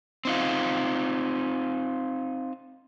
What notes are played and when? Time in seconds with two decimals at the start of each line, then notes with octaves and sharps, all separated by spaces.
0.25 C4 D#4 F4